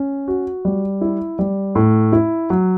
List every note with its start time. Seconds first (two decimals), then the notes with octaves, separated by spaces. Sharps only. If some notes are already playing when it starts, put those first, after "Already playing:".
Already playing: C#4
0.28 F#4
0.65 G3
1.01 E4
1.39 G3
1.75 A2
2.13 E4
2.50 F#3